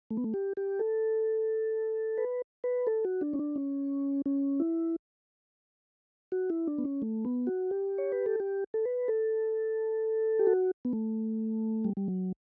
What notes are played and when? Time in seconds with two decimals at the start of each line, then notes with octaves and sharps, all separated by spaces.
0.10 A3
0.17 B3
0.24 A3
0.34 G4
0.57 G4
0.79 A4
2.18 B4
2.64 B4
2.87 A4
3.05 F#4
3.21 D4
3.33 C#4
3.39 D4
3.56 C#4
4.26 C#4
4.60 E4
6.32 F#4
6.50 E4
6.67 D4
6.78 B3
6.85 C#4
7.02 A3
7.25 B3
7.47 F#4
7.71 G4
7.98 C#5
8.12 B4
8.26 A4
8.40 G4
8.74 A4
8.85 B4
9.08 A4
10.39 G4
10.47 F#4
10.85 B3
10.93 A3
11.85 G3
11.97 G3
12.08 F#3